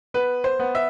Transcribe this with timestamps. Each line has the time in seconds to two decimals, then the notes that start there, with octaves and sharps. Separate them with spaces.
0.14 B3 B4
0.44 C5
0.59 B3
0.75 E5